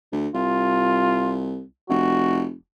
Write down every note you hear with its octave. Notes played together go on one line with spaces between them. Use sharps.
D2
C2 F4
F1 F#4